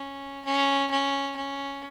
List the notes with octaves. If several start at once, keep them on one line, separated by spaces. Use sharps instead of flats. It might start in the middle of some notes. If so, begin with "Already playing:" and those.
Already playing: C#4
C#4
C#4
C#4